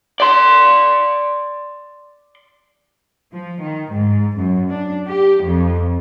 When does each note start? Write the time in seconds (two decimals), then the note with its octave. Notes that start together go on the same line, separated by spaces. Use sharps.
0.20 D5 C6
3.32 F3
3.61 D#3
3.93 G#2
4.36 F#2
4.69 D4
5.07 G4
5.43 F2